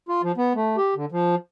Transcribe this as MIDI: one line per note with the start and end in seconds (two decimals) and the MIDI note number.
0.09 0.22 65
0.23 0.32 53
0.37 0.53 59
0.55 0.76 57
0.77 0.94 67
0.96 1.05 50
1.12 1.35 53